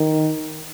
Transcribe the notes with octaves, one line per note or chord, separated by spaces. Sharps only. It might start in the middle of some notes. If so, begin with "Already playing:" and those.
Already playing: D#3